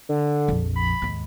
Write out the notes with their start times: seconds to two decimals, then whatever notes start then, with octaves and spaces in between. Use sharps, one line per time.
0.09 D3
0.48 A#1 F2
0.76 B5
1.02 D#2 G#2